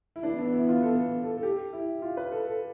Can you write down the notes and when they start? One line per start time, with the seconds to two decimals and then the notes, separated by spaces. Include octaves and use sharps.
0.16 E4
0.23 E3 B3 D4
0.38 D4
0.53 E4
0.68 F4
0.83 A4
1.23 A4
1.38 A4
1.43 G4
1.73 E4
2.02 F4
2.17 B4
2.32 A4
2.47 A4